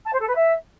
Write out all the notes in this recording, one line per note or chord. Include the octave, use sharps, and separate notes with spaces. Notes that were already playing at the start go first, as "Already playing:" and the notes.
A5
C5
A4
B4
E5